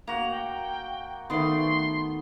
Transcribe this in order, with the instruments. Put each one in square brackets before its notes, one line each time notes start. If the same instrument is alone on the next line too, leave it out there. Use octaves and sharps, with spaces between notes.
[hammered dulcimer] A#3 F#4 [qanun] A#5 [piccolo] F7
[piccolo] G5
[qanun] D#3 D5 [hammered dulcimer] A3 B3 [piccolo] C6